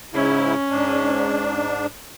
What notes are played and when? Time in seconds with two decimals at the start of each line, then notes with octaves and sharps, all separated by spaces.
0.14 G#2 C#3 C#4 E4
0.70 G#2 D4